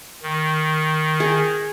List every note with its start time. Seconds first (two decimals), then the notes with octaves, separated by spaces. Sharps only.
0.22 D#3
1.20 G#4